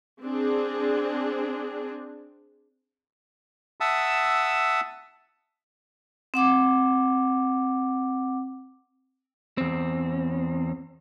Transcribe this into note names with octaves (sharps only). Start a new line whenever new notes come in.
C4 D4 G#4
E5 F#5 A5 D#6 E6
C4 F#5 D6
E2 C4